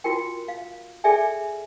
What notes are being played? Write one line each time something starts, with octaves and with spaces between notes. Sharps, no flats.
F4 F#4 A#4 G5
F5
G#4 A4 D5 E5 G5 G#5